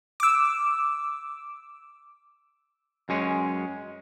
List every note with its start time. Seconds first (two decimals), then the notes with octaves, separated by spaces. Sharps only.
0.20 D6 E6
3.09 F#2 G#3 C#4